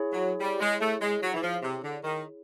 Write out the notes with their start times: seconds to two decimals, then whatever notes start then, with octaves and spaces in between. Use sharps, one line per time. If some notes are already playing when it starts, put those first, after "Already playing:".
Already playing: E4 G#4 C#5
0.13 F#3
0.40 G3
0.61 G#3
0.81 A3
1.01 G#3
1.22 F#3
1.34 E3
1.42 F3
1.63 C3
1.83 D3
2.04 D#3